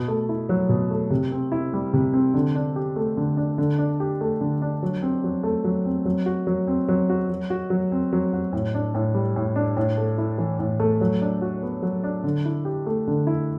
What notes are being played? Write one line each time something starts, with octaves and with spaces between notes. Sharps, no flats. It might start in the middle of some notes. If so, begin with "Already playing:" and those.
Already playing: B2
A3
E4
F#3
B2
A3
C3
C4
E4
G3
C3
C4
D3
D4
G4
A3
D3
D4
D3
D4
G4
A3
D3
D4
F#3
C4
F#3
A3
F#3
C4
F#3
F#4
F#3
C4
F#3
F#4
F#3
F#4
F#3
C4
F#3
F#4
A2
D4
A2
G3
A2
D4
A2
A3
E4
E3
A2
A3
F#3
D4
F#4
B3
F#3
D4
D3
E4
G4
A3
D3
E4